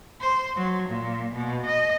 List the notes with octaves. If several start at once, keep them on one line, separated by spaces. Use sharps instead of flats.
C5
F#3
A#2
B2
D#5